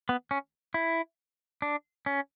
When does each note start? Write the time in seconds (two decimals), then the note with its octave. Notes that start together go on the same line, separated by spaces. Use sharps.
0.09 B3
0.31 C#4
0.74 E4
1.62 D4
2.06 C#4